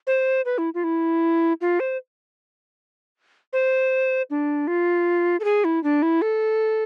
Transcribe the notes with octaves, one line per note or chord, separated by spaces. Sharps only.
C5
B4
E4
F4
E4
F4
C5
C5
D4
F4
A4
G#4
E4
D4
E4
A4